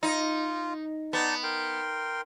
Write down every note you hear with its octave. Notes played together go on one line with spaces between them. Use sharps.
D#4 F4
B3 D#4 D5 A5
A#4 G5 C6